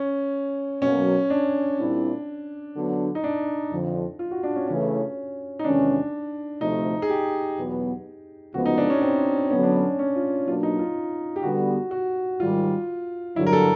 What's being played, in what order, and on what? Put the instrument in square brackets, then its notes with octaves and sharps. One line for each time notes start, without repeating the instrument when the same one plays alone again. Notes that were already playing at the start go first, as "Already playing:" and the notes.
Already playing: [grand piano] C#4
[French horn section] B2 F#3 A#3 [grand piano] C#4
[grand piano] D4
[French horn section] A#2 G3 C4 E4
D3 F#3 B3 D4
[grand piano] D#4
D4
[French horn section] F2 D3 F3
[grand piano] F4
F#4
D4
C#4
[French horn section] C#3 E3 A3 [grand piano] C#4
[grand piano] D#4
[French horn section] E2 C3 D#3 G#3 C#4 [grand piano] D4
[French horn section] D2 C3 F3 A3 [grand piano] D#4
[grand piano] G#4
G4
[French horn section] E2 B2 F#3 B3
[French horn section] D2 C#3 F3 G#3 B3 [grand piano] F#4
[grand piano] D#4
D4
C#4
C4
[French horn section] D3 F#3 B3 [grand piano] C#4
[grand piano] D4
C#4
C#4
F4
[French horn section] B2 F#3 A#3 D4 [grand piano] F4
[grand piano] D#4
F4
G4
[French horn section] D3 G3 B3 [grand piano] F#4
[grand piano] F#4
[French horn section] G#2 D#3 G3 [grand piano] F4
[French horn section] G2 D3 F#3 [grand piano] E4
[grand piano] A#4
A4